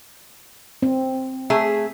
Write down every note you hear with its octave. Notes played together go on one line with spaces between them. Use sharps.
C4
A3 G#4 E5